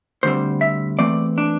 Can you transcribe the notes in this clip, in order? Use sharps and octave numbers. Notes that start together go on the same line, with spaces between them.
D2 D3 G3 C4 C5
E5
E2 E3 A3 C4 D5
D4